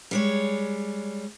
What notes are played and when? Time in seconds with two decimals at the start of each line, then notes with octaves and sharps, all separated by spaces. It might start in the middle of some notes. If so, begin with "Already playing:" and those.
0.11 G3 G#3 C#5